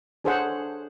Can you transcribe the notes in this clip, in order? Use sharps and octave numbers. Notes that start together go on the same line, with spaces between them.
D4 G#4 A4 C5 C#5 F#5